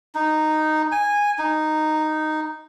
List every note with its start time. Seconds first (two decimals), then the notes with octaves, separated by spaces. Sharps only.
0.15 D#4
0.92 G#5
1.39 D#4